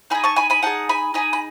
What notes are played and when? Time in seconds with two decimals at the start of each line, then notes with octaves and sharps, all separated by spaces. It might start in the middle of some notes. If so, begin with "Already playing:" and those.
0.10 D#4 G#4 G#5 B5
0.24 A5 C#6
0.36 G#5 B5
0.50 G#5 B5
0.62 D#4 G#4 F#5 A5
0.89 G#5 B5
1.14 D#4 G#4 G#5 B5
1.33 B5